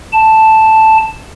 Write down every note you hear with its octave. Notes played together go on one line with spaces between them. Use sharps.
A5